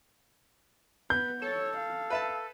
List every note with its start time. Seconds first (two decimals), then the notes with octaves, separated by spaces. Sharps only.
1.10 B3 B4 G6
1.42 A4 C#5
1.77 F5
2.10 B4 E5 A5